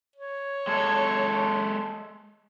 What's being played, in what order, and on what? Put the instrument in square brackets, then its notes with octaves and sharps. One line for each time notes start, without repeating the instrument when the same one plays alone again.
[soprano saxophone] C#5
[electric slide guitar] G#3 A4